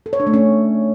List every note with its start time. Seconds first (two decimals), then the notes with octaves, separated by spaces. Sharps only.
0.06 A4
0.13 C#5
0.20 D4
0.27 A3
0.34 C#4